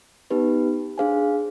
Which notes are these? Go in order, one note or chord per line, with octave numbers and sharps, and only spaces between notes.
B3 D#4 G4 B4
D4 G#4 C5 F5 G#5